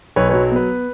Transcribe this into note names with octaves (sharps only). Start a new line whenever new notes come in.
B1 B4 C#5
F#3 B4 C#5
B3 B4